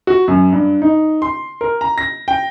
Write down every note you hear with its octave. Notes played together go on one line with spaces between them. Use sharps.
F#4
F#2
G2
D#4
C6
A#4
A#5
A#6
G5